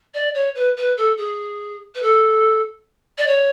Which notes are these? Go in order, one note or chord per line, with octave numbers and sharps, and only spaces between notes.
D5
C#5
B4
B4
A4
G#4
B4
A4
D5
C#5